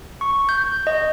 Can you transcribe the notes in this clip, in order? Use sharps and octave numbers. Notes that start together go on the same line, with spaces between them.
C#6
G6
D#5